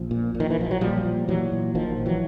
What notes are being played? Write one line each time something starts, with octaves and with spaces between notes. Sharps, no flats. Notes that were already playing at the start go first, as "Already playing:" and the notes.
Already playing: A#1 F3
A#2
A#2
D#3
E3
A#1 F3
F#3
A#2 F3 G3
A#2
A#2 E3 F#3
A#2
A#1 D#3 F3
A#1
E3 F#3